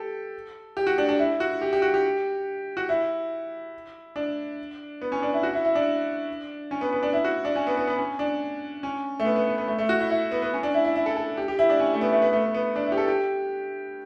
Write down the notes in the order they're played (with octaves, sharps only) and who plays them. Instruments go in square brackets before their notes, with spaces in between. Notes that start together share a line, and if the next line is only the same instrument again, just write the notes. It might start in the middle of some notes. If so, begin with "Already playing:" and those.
Already playing: [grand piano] G4 A4
G4
F#4
D4
D4
E4
F#4
G4
G4
F#4
G4
F#4
E4
D4
B3
C#4
D4
E4
F#4
E4
E4
D4
C#4
B3
B3
D4
E4
F#4
D4
C#4
B3
B3
B3
C#4
D4
C#4
A3
B3
B3
B3
B3
A3
A3
F#4
E4
E4
B3
B3
C#4
D4
E4
E4
E4
A4
A4
G4
G4
E4
D4
C#4
A3
B3
A3
B3
A3
B3
B3
D4
E4
G4
A4
G4